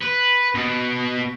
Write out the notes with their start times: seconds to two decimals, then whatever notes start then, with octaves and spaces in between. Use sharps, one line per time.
0.03 B4
0.55 B2